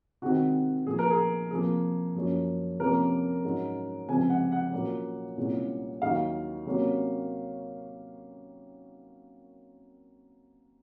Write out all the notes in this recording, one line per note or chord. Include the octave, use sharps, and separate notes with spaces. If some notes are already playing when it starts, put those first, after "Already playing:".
C3 D#3 G#3 C4 F#4
A#2 F3 A#3 G#4
A#4
G#4
C3 F3 A#3 G#4
F#2 F3 A#3 C#4
C3 F3 A#3 C#4 A#4
G#2 F#3 C#4
C#2 C3 F3 G#3 C4 G#5
F#5
F#5
A#2 F#3 A#3 C#4
C2 A#2 G#3 C#4
D#2 D#3 F#3 F5
C3 F#3 A#3 C#4